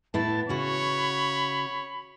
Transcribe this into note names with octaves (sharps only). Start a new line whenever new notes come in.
A2 B3 E4 A5
C#3 F#4 C#5 B5